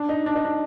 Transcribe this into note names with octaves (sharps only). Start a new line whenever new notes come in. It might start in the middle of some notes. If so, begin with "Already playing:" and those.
Already playing: D4
D#4
D4
D#4
D4